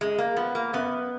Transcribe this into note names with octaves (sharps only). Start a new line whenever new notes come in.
F#2 G#3
A#3
F3 B3
A#3
F#2 B3